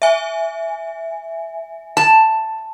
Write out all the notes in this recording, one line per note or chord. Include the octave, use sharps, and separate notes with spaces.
E5 G#5
A5